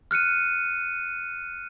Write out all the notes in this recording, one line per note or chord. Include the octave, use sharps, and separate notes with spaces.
F6 F#6 C#7 D#7